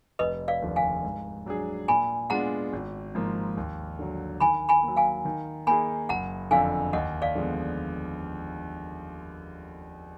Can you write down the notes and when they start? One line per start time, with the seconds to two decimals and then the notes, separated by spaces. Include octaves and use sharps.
0.19 F1 B4 D#5
0.48 D5 F5
0.62 D#2 D3 F3
0.76 F5 G#5
1.05 G#2
1.46 F#3 D4 G#4
1.88 A#2 G#5 B5
2.30 G#3 B3 D4 F4 F#5 A#5
2.73 G#1
3.15 G#2 F3 A#3
3.57 D#2
3.99 D3 F#3
4.40 D#3 G#5 B5
4.69 G#5 B5
4.83 F#3 A#3
4.96 F5 G#5
5.25 D#3
5.67 A#3 D#4 G#4 G#5 B5
6.09 F#1 F#5 A#5
6.51 F2 D3 F5 G#5
6.93 D#2 D#5 F#5
7.22 D5 F5
7.35 D3 F3 G#3 B3